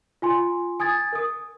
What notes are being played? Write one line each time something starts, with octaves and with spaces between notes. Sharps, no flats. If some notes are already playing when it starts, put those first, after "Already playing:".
F4 G#5 C6
G#5 D#6 G#6 A6
A#4 D#6